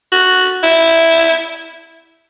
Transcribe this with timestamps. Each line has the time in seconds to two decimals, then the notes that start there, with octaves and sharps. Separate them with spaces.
0.12 F#4
0.63 E4